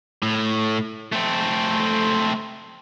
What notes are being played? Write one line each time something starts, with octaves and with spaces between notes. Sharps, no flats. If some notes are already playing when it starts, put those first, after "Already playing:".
A2
A3 C4